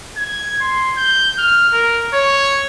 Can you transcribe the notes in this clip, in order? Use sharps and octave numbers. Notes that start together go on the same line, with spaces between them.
G#6
C6
G6
F6
A#4
C#5